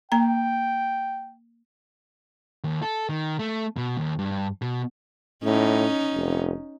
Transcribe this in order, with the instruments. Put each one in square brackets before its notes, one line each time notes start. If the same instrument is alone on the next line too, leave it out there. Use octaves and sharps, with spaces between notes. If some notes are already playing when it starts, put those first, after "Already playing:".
[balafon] A#3 A#5 [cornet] G5
[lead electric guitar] D#2
A4
D#3
A3
B2
D#2
G2
B2
[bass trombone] A2 [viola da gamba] C#4 D#4
[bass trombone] F1